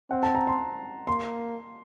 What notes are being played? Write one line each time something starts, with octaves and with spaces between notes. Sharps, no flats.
C4 F#5
A5
A#5
C6
A#3 C6